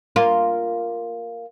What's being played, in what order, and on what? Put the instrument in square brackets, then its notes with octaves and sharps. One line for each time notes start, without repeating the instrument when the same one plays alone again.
[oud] A#3 F4